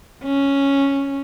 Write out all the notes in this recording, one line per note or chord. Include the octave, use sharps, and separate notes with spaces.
C#4